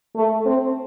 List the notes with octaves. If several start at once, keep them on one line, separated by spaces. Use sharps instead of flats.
A3
C4